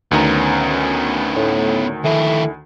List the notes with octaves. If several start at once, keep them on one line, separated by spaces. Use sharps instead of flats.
D2 D#3 B3 C#4 A#5
A2
D#2 A3 E4